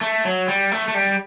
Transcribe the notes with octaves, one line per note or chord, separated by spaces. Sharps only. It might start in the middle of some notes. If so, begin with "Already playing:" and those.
A3
F#3
G3
A3
A3
G3